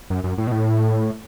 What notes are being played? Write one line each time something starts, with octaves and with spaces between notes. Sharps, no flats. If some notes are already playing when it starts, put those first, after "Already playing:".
F#2
F#2
A2
B2
A2